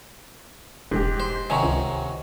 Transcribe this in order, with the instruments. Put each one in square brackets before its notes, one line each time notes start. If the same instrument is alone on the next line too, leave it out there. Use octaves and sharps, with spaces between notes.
[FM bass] E1 [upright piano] G#2 G4
[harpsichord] C5
[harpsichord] C3 D#3 F#3 [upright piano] G#5 A#5 C#6
[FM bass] C#2